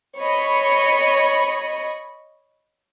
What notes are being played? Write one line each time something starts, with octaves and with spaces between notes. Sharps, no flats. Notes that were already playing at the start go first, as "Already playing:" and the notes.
C#5 D#5 B5